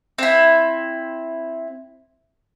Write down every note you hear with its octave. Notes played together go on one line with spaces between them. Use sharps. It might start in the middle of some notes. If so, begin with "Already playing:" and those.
C4 E4